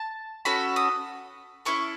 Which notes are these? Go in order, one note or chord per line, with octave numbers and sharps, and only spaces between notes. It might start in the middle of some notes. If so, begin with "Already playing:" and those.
Already playing: A5
C#4 F#4 A4 B5
D#6
C#4 E4 A4 C#6